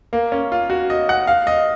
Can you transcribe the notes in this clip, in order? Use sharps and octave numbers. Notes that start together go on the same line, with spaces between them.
A#3
C#4
F4
F#4
D#5
F#5
F5
D#5